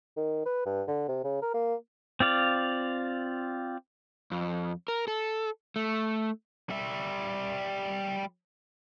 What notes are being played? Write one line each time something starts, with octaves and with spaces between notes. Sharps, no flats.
D#3
B4
G2
D3
C3
C#3
A#4
A#3
C4 F4 D5 F5
F2
A#4
A4
A3
G3 E5